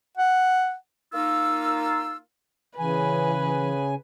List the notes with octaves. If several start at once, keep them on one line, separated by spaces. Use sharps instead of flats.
F#5
A#3 D#4 F4 E6
C#3 E3 B4 G#5